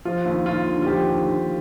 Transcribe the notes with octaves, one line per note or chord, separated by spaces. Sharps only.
F3 F4
D#2
D#2 F4
D3
F4
F3 G4
D#2
D#2